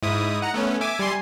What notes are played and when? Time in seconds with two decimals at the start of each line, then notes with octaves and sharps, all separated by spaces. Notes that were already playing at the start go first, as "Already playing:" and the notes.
0.03 G#2 E4 D#6
0.42 F#5 A#5
0.54 A3 B3 C#4
0.81 E5 G#5 D6
0.99 G3 G#5 C6